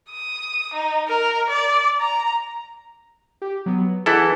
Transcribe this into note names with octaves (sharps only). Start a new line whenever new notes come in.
D#6
D#4
A#4
D5
A#5
G4
F#3 B3
E3 E4 G#4 A4 F#5